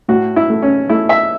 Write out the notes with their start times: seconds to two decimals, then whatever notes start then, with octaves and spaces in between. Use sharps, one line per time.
0.08 A2 F#4
0.36 E4
0.50 A3
0.62 C#4
0.89 A3 E4
1.09 E5